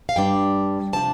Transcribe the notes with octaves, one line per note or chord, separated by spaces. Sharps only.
F5
G2 G3 D4 G5
C3 F3 D4 A5